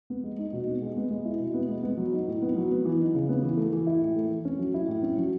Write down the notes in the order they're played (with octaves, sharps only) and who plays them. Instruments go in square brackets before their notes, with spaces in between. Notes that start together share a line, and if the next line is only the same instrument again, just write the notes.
[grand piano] B3
G#3
D#4
B2
B3
G#3
B3
G#3
E4
B2
B3
G#3
B3
F#3
D#4
A2
B3
F#3
B3
E3
D#4
C#3
B3
E3
A3
E3
E4
A2
A3
E3
C#4
F#3
E4
A2
C#4
F#3